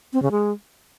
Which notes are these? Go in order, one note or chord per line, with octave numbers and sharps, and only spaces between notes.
C4
C#3
G#3